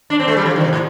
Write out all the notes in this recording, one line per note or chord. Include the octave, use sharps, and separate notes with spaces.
D4
C4
A3
G3
F3
D#3
C3
A2